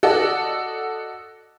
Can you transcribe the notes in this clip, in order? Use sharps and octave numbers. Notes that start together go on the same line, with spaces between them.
F#4 A4 D5 D#5 F#5